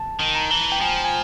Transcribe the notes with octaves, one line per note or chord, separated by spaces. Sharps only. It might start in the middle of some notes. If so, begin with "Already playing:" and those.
Already playing: A5
D#3
A#5
E3
G5
F3 G#5
G#5